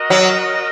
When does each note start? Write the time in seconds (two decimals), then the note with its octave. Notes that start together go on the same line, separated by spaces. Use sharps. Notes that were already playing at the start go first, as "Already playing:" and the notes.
Already playing: F#4 A#4 D#5
0.10 F#3